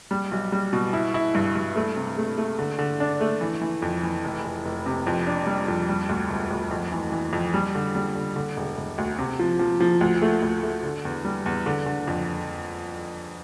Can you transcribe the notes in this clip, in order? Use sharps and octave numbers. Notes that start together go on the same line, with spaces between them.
G3
B1
G3
B2
E4
E4
G2
G2
A3
C3
A3
A3
D3
D3
D4
A3
E3
E3
F2
E3
F1
F1
F1
C3
F2
D4
G3
F2
G3
D2
E1
D2
F2
E3
E3
F2
G3
D3
G3
D3
D3
E1
E1
D2
C3
F3
F3
F3
D2
A3
D2
A3
D3
E2
G3
E2
D3
D3
F2